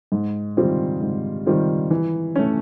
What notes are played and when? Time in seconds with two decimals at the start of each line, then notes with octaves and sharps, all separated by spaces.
0.12 G#2
0.57 D#3 G3 C4 F4
1.02 G#2
1.46 D#3 G3 C4 F4
1.91 E3
2.36 A3 C#4